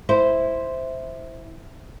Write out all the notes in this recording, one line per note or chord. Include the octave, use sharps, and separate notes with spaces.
E4 C5